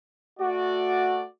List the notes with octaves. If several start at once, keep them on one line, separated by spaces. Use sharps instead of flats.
A3 F#4 D5